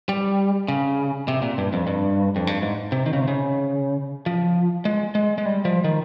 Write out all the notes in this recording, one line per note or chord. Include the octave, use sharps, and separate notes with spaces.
G3
C#3
C3
A#2
G2
F2
G2
F2
G2
G#2
C3
D#3
C#3
C3
C#3
F3
G#3
G#3
G#3
G3
F3
D#3